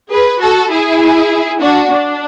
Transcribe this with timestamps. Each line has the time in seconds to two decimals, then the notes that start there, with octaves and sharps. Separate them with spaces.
0.10 G#4 B4
0.40 F#4 A4
0.70 E4 G#4
1.60 D4 F#4
1.91 D4